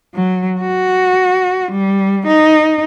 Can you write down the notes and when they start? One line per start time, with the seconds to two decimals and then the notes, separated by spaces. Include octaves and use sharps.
0.15 F#3
0.60 F#4
1.72 G3
2.27 D#4